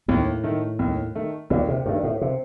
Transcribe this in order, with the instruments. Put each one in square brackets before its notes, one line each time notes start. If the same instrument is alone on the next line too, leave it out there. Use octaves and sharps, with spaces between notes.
[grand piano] D#2 [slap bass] A2
[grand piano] D#3 A3
D#2
D#3 A3
[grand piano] D#2 [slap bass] A#2
[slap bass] C3
[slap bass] G2 [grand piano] D#3 A3
[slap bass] A2
C3